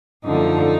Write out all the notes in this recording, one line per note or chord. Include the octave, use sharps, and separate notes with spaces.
F#2 D3 F3 A3 D#4